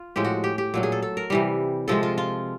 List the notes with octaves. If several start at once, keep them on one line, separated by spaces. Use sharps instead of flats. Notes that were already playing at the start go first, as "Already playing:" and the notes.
Already playing: F4
A2 F3 G#3 G4
F#4
G4
G4
A#2 F#3 A3
G#4
A4
A4
A#4
C3 E3 G3
C3 F3 G#3 A4
F4
F4